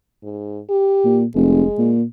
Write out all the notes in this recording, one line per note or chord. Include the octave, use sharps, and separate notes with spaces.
G#2
G4
A#2
F1 G#3
A#2